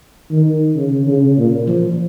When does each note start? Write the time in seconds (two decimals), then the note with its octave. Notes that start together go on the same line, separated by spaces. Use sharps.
0.31 D#3
0.76 C#3
1.07 C#3
1.38 A#2
1.68 F3